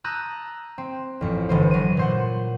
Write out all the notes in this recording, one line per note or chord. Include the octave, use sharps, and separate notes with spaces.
A5 A#5 D#6 E6 F#6 G6
C4
A1 F2 C#7
G1 E3 C5
F#3 D#7
A#2 C5 F#5